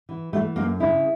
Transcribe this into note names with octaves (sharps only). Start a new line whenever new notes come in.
E3
E3 A3
F#2 A#3
C#3 E4